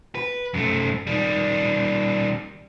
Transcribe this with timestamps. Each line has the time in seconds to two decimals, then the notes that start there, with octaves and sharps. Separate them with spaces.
0.15 B4
0.54 F#2 A3
1.07 D#3 G3